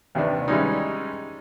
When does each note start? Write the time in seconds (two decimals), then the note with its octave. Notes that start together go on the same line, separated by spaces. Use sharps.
0.15 D#2 C3 D#3 D4 B4
0.48 E3 G3 G#3 C#4 D#4